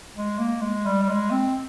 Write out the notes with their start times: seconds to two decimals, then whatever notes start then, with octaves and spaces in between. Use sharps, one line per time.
0.16 G#3
0.38 A#3
0.62 G#3
0.86 G3
1.03 G3
1.09 G#3
1.31 C4